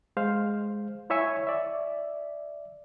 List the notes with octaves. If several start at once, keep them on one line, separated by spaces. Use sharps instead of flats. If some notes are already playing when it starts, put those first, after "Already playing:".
G#3 C5 F5
E4 C#5 E5 G#5 C#6
D5 E5